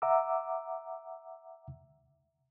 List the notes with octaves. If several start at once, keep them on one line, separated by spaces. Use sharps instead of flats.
E5 F#5 A#5 D6 E6